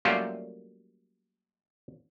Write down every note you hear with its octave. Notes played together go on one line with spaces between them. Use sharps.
F#3 G3 A3 A#3 C#4 F4